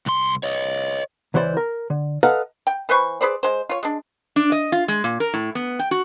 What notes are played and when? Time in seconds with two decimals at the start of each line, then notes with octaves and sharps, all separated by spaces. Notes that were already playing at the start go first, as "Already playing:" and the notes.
0.06 C2 C6
0.43 C#5 D#5
1.34 C#2 E3 E4 C5 D5
1.57 A#4
1.90 D3
2.23 A4 B4 D#5 F5 F#5 A#5
2.67 G5
2.89 E3 B4 C5 C#6
3.21 G#4 B4 C5 D5
3.43 G#3 C5
3.69 F4 C#5
3.83 G#3 D4
4.36 D4
4.52 D#5
4.72 F4
4.88 G#3
5.04 A#2
5.20 A#4
5.34 A2
5.55 B3
5.79 G5
5.91 F#4